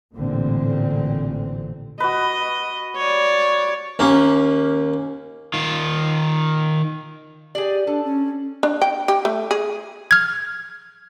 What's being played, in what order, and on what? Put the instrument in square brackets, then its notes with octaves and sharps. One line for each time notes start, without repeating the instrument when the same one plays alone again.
[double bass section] A1 A#2 D3 C4
[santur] F#4 B4 [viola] D#5
[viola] C#5 D5
[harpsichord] D#2 A#3 C#4
[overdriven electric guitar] D#3 F4
[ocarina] G4 [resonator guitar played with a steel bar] G#4 D5
[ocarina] D4 [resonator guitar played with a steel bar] A4
[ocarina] C#4
[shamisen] D4
G5
G4
A3
G#4
[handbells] F6 G#6